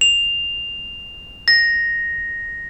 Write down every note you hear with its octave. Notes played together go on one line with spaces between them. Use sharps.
F7
A#6